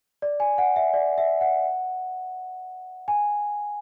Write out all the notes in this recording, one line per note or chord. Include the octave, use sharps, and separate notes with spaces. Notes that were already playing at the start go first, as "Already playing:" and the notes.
D5
G#5
F#5
E5
D5
E5
F#5
G#5